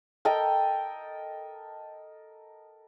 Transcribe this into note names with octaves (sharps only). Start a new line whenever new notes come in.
A4 A#4 D#5 G5